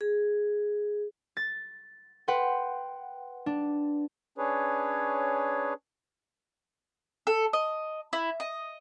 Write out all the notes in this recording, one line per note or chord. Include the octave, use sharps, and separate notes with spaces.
G#4
A6
B4 F#5 G5 C6
D4
C#4 D4 G#4 B4 C#5
A4
D#5
E4
D#5